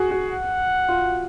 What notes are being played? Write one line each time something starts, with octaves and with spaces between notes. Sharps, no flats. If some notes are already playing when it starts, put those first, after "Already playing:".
Already playing: F#4 G#4
F#4
F#5
F4